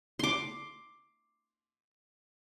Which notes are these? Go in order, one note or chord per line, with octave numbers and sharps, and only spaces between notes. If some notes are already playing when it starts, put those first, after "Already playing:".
C6 D6